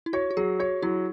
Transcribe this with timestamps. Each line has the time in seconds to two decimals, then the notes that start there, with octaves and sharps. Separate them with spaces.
0.06 E4
0.13 F#4 C#5
0.31 F#4
0.37 F#3 G#4
0.60 F#4 C#5
0.82 F#3 E4